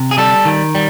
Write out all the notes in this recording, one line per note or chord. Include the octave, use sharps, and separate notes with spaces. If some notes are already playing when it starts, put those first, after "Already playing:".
Already playing: C3
G#4
G3 A4
D#3
G3